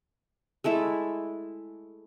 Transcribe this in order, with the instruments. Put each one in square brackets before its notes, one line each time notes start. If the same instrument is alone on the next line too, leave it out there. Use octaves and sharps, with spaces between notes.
[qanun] G#3 A3 E4 A4